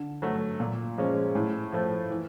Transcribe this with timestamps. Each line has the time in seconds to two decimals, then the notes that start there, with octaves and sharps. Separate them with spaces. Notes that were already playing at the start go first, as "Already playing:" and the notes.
Already playing: D3
0.22 F#3 A3
0.60 A#2
0.98 F3 G#3 C#4
1.35 A2
1.72 F3 A3
2.10 E3